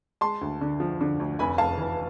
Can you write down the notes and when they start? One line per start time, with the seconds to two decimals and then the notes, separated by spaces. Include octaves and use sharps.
0.21 G#3 A5 C6
0.41 D2
0.61 D3
0.80 F3
1.01 D3
1.20 D2
1.39 F1 G#5 B5
1.58 F1 F5 A5
1.78 E3